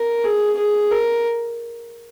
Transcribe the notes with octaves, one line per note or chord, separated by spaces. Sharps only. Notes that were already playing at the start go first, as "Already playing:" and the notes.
Already playing: A#4
G#4
G#4
A#4